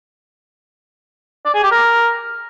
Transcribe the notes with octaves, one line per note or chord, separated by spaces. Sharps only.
D5
G#4
G4
A#4